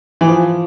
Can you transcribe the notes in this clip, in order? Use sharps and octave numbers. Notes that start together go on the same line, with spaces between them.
E3
F3